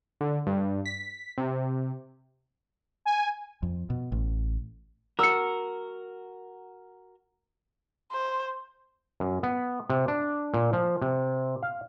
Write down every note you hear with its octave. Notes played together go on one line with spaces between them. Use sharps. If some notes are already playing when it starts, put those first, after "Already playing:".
D3
G2
B6
C3
G#5
F2
B2
A1
F#4 A#4 E6 C#7
C5
F#2
B3
C3
D4
A#2
F3
C3
F5